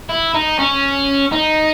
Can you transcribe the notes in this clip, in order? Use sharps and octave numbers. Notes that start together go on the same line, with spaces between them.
E4
D#4
C#4
D#4